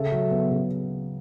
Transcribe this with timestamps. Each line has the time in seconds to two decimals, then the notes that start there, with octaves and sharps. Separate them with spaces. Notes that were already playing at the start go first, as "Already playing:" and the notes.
Already playing: C#3 A3
0.12 F#3
0.31 B3
0.51 C#3